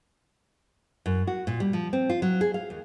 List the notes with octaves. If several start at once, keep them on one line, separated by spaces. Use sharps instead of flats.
F#2
F#4
A#2
G3
F3
C4
F4
F#3
G#4
F5
D#2